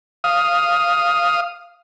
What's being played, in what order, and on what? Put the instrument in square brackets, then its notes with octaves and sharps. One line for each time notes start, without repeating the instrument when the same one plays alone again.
[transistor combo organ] F5 D#6